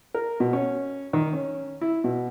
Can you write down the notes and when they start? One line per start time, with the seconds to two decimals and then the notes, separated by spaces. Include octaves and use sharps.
0.15 A#4
0.40 B2
0.53 C#4
1.13 D#3
1.33 C#4
1.81 E4
2.04 B2